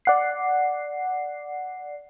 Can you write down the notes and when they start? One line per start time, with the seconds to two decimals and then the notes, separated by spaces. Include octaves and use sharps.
0.05 D5 F#5 C7